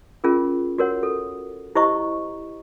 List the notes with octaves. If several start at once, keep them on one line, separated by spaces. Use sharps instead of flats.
C#4 F4 G#4 A#4
F#4 A#4 C#5 F#5
A4
E4 G4 C5 D#5 A#5 C#6